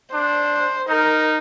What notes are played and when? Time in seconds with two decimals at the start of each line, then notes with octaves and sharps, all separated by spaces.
0.13 D4 C5
0.89 D#4 A#4